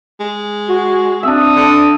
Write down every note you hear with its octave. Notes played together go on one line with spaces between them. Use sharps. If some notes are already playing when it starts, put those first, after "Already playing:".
G#3
F#4
C4 D4 E5 D#6
D3